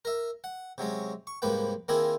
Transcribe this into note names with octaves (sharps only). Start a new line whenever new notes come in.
A#4 E5
F#5
C3 F#3 G#3 C#4
C#6
C2 G#2 F3 A#3 B4 G5
D#3 A#3 C4 E4 F4 G#4